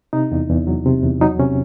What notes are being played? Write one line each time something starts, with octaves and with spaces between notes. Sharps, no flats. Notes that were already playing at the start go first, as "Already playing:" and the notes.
C3 D#4
E2
E2
F#3
C3
E2
F#3 D#4
C3 C#4